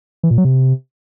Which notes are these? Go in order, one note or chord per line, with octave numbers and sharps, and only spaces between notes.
E3
A#2
F#3
C3